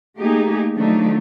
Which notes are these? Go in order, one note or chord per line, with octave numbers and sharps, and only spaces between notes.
A3 A#3 D#4 G4 G#4
D#3 F3 F#3 A3 D4 D#4